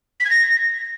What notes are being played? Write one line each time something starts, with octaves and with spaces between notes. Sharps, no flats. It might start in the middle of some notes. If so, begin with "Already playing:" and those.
B6
G#6
A#6